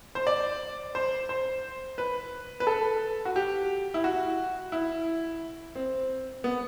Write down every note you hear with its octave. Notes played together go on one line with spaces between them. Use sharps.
C5
D5
C5
C5
B4
B4
A4
F#4
G4
E4
F#4
E4
C4
B3